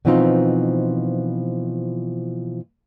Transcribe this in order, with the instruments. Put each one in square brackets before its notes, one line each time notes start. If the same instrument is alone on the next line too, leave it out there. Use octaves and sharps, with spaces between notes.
[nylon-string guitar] B2 E3 F3 C4 D#4 F4